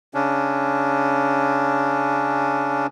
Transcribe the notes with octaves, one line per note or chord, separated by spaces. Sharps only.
C#3 C#4 D4